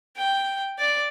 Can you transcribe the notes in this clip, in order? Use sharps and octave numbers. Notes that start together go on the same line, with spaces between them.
G5
D5